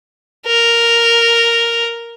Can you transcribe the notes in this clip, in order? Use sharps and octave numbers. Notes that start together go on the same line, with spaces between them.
A#4